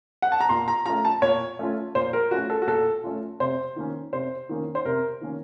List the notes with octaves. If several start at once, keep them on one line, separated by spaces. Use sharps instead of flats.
F#5
A5
A#5
A#2 C6
A#5
A3 C#4 F4 A#5
A5
A#2 C#5
A3 C#4 F4
A#2 C5
A#4
A3 C#4 F4 F#4
A4
F#4
A#2 A4
A3 C#4 F4
C3 C5
D#3 A#3 C#4
C3 C5
D#3 A#3 C#4
C5
C3 A#4
D#3 A#3 C#4